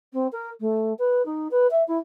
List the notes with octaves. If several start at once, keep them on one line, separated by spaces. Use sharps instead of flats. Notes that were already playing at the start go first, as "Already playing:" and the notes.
C4
A#4
A3
B4
D#4
B4
E5
E4